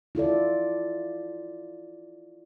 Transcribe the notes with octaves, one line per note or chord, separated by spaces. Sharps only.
E4 F4 A4 D5